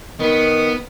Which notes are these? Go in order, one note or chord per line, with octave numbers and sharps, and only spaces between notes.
D#3 B3